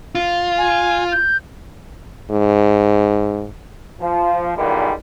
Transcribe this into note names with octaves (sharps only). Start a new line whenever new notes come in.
F4
G#5
G6
G#2
F3
B1 A#2 D#3 E3 G3 G#3